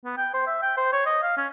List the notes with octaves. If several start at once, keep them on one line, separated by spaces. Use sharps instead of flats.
B3
G5
C5
E5
G5
C5
C#5
D#5
F5
C#4